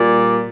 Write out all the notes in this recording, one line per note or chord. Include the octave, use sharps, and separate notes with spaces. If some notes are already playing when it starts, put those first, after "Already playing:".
Already playing: A#2 G3 D5